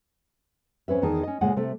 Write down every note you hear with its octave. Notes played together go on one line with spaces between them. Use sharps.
F2 C4 C#4 B4 E5
E2 D#3 D#4 G#4 A5
C#4 D#5
D2 A#2 C#3 G#3 F#5 G#5
C3 A3 A4